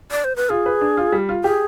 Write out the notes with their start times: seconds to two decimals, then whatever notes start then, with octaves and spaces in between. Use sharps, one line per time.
0.11 D5
0.24 C5
0.36 B4
0.50 F4 G#4
0.66 B4
0.81 D4
0.97 F4
1.12 G3
1.29 F4
1.44 G4 G#4